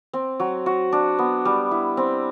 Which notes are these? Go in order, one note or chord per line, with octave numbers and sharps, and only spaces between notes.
C4
F#3
F#4
D4
B3
G3
E4
C4